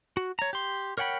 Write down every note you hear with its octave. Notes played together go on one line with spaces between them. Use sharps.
F#4
C#5 A#5
G4 C6
A#4 C#5 F#5 G5 B5